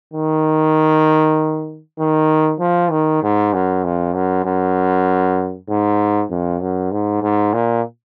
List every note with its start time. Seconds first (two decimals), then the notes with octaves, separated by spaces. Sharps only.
0.13 D#3
1.99 D#3
2.60 F3
2.91 D#3
3.22 G#2
3.53 F#2
3.84 F2
4.15 F#2
4.45 F#2
5.68 G#2
6.30 F2
6.61 F#2
6.91 G#2
7.22 G#2
7.54 A#2